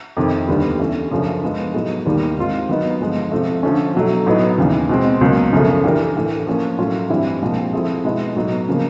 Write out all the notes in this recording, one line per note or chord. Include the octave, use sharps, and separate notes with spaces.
F2 C3 D#3
D#2 D3 G3 B3
E3 A3 C#4
F#2 C#3 F3 A3 D4
F3 G#3 B3
A2 F#3 B3 D#4 G#4
D#2 D#3 G3 A#3
G#2 D#3 G#3 C4 F4
D#3 F#3 B3 D#4
G2 D3 F3 G#3
C3 F3 A3
D3 F3 A3 C#4
B2 F#3 A3
A2 F#3 B3 D#4
D#2 C#3 E3
B2 G#3 C4
C#2 B2 F#3 A#3
F#2 C#3 F3 A3
E3 A3 D4 G4 A#4
A2 E3 A3
F3 A#3 C#4
A2 F#3 A3 C#4 F4
G2 E3 G3 C4 E4
C2 A#2 F3 G#3
F3 A3 C4 E4 G#4
B2 G#3 B3 E4
A2 F#3 B3 D#4
C#3 F3 A#3